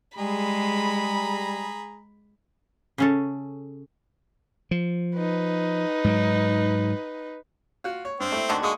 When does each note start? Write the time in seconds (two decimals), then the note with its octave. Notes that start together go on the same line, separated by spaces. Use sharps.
0.18 G3 G#3 G#4 A#5 B5
2.98 C#3 C#4 A4
4.71 F3
5.16 D#4 B4
6.04 G#2 F#3
7.84 F4 F#4
8.05 C#5
8.20 G2 C4
8.32 A3 E4
8.49 D2 D3 D#3 F#4
8.62 G#3 A#3 C#6 D#6